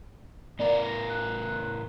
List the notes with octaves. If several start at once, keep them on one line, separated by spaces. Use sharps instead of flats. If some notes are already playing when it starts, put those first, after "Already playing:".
A2 B3 A#4 D5
A#6
F#6